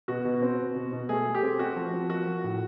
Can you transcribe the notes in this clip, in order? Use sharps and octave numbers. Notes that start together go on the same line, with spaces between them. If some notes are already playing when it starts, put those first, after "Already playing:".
B2 F#4
B2
C4
B2
B2
B2
A3 G#4
A3
G4
C4
C4 F#4
F3
F3
A#3 F#4
F3
A2